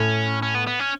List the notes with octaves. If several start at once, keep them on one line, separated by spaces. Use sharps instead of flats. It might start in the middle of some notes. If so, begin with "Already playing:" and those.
Already playing: A2 C#4
C#4
B3
B3
C#4